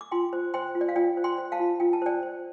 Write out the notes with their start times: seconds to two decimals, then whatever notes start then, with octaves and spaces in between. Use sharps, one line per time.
0.01 D6
0.12 F4 G5 C6
0.33 C5
0.54 C5 G5 C6
0.75 F4
0.81 D5
0.89 F5
0.96 F4 D5 G5
1.17 C5
1.24 G5 C6
1.38 C5
1.52 F5 A5
1.60 F4
1.80 F4 G5
1.93 A5
2.02 C5 D5 G5
2.23 C5